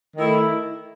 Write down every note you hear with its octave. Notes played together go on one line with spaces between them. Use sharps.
D#3 A3 E4